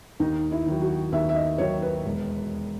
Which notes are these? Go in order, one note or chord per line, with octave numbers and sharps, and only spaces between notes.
D#2 D#4
E4
D#3 F#3
F#4
D#2 E5
E5
D#5
D#3 F#3 C#5
B4
E1